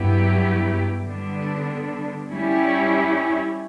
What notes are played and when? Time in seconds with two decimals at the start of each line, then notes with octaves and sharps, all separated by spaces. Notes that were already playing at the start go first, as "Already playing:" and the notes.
Already playing: G2 F#3 B3 E4 G4
1.04 D3 G3 B3 D4
2.31 G3 C#4 E4 G4